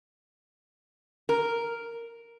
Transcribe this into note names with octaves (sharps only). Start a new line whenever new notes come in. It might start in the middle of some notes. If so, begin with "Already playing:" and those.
A#4